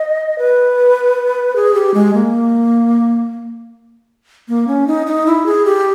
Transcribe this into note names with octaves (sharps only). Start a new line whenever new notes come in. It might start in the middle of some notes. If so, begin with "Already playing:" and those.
Already playing: D#5
B4
G#4
G4
G#3
A#3
A#3
C#4
D#4
D#4
E4
G#4
G4